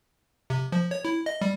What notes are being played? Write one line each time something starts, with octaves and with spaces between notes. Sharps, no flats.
C3
F3
C#5
E4
D#5
G3